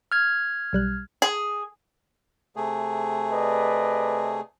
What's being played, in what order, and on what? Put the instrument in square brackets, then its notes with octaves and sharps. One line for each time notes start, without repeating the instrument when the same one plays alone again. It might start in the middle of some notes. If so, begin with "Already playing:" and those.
[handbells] F6 G#6
[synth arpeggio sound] B1 G3 F#6
[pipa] G#4
[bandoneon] C3 A3 G#4
[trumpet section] B4 D5 D#5